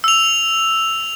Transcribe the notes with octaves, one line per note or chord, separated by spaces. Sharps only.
E6 F7